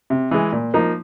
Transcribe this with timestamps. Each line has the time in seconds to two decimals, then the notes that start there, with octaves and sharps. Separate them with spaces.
0.10 C3
0.31 E3 G#3
0.52 A#2
0.74 F3 A#3 D#4